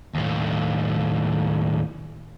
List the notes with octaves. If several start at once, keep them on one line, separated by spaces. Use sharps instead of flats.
D#2 A2